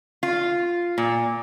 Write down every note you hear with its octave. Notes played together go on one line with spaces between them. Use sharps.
F4
A#2